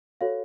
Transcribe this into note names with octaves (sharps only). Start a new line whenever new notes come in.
F#4 A4 C#5 F5